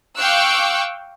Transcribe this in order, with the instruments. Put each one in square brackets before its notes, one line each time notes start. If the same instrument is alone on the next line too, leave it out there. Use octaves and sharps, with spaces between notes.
[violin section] F5 G5 C#6 D6 E6 F#6